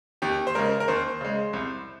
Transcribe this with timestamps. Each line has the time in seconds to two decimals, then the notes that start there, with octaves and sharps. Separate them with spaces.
0.22 D#2 G4
0.47 C5
0.55 C#3 G#3 A#4
0.80 A#4
0.88 D#2 C5
1.21 C#3 G#3
1.53 C2